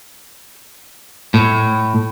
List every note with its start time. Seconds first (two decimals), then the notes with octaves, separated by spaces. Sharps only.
1.34 A2